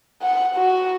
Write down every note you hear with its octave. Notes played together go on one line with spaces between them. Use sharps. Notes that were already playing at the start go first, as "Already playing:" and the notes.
F#5
F#4